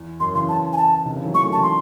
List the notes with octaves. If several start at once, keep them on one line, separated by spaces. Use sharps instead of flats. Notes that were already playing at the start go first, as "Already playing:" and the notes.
Already playing: E2
F#2 C6
C#3 E3 C6
A5
G#5
A5
C3 D#3
C#3 E3
D#3 F#3
E3 G#3 C#6
F#3 A3
C#3 E3 A5
C6